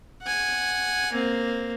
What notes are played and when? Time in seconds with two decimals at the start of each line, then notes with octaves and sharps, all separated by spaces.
0.22 F#5 G#5
1.12 A#3 C4